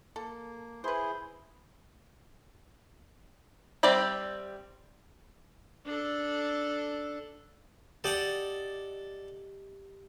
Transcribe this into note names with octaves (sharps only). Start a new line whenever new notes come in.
A#3 A4
E4 G#4 B4 C5
G3 C4 G4 D5 E5
D4 A4
G4 A4 D5 D#5 F#5